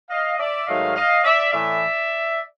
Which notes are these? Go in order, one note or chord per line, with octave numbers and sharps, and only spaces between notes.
D#5 F5
D5 E5
G#2 D#3 F#3 A3 D#5 F5
D#5 F5
D5 E5
A2 E3 A3 D5 E5